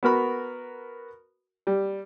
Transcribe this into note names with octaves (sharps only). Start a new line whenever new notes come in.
B3 F#4 A#4 B5
G3